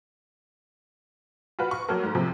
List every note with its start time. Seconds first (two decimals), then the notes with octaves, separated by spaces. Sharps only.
1.59 F4 F#4 B4
1.71 C#6
1.89 F#3 A#3 A4 A#4
2.03 G#2
2.15 C3 F3